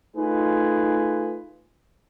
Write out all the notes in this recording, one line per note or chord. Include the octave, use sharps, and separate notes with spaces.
A3 D#4 F4 G#4 B4